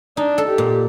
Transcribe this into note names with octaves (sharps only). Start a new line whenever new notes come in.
D4 D#4
A4
G4
A#2